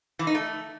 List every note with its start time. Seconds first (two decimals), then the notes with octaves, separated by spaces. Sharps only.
0.19 E3
0.27 D#4
0.35 A3